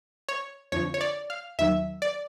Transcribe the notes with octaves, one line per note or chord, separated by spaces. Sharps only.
C#5
F2 D3 F3 C#5
C#5
D5
F5
D#2 D#3 F#3 E5
D5